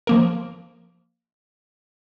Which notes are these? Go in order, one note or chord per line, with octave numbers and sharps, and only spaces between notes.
F3 A#3 A#4